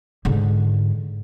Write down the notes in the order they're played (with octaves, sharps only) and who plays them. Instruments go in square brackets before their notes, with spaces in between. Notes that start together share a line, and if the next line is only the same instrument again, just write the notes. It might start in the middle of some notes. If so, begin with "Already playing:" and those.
[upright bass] G#2 D3